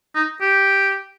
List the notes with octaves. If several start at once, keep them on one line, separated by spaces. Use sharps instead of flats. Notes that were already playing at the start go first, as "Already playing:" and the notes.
D#4
G4